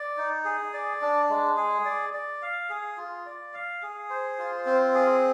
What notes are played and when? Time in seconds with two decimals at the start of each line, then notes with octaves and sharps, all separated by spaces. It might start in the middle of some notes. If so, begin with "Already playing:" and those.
Already playing: D5
0.17 D#4
0.45 G#4
0.74 D5
1.02 D4
1.30 G#3
1.57 G#4
1.85 D5
2.13 D5
2.42 F5
2.70 G#4
2.98 F4
3.26 D5
3.54 F5
3.83 G#4
4.10 C5
4.38 F4
4.66 C4
4.94 G#4